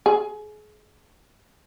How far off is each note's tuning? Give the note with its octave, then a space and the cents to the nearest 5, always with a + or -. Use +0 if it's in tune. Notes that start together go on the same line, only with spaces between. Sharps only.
G#4 +30